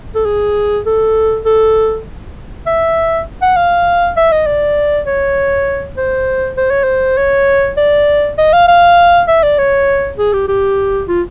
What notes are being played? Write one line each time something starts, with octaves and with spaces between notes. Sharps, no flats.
A4
G#4
A4
A4
E5
F#5
F5
E5
D#5
D5
C#5
C5
C5
C#5
C5
C#5
D5
D#5
F5
F5
E5
D5
C#5
G#4
G4
G4
F4